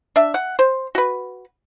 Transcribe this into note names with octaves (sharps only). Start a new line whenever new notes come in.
D4 E5
F#5
C5
F#4 B4